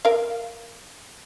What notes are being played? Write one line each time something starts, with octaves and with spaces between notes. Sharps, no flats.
A#4 F5